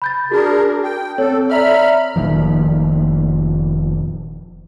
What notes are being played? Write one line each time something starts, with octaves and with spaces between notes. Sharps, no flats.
B5 G6 A6
D4 F#4 G#4 A#4
G5
C4 A4 C#5
D5 E5 A#5 B5 F6
F1 A#2 D#3 F3